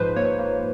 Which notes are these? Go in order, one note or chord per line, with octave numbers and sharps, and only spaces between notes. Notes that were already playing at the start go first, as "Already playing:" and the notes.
Already playing: G#2 F3 B4 C5
A#3 C#5
A#3